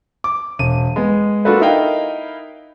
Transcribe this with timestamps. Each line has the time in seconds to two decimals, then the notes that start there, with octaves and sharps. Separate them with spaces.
0.24 D6
0.59 E1 D#7
0.96 G#3 B3
1.45 A#3 D4 F4 F#4 A4 B4
1.61 D#4 E4 A#4 D#5 F5 G5